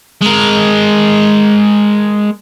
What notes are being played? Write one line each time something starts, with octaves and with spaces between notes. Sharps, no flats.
G#3 A#4